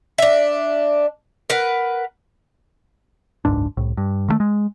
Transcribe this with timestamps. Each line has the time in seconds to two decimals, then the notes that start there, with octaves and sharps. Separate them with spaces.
0.18 D4 E5
1.50 A#4 B4 F#5
3.45 F#1 C#2 G#2 D4
3.77 C2 A2
3.97 G2
4.28 D#3 E3 A3
4.40 G#3